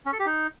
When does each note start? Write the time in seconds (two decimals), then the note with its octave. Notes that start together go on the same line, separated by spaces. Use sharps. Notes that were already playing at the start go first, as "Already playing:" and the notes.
0.06 C#4
0.13 A4
0.19 G4
0.26 D#4